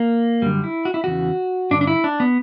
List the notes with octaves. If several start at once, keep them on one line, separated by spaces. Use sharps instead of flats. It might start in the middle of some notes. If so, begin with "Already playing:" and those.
Already playing: A#3
F#2 D3 G3
E4
F#4
E4
E2 C#3 E3 F#4
G2 D3 D4
D4
E4
D4
B3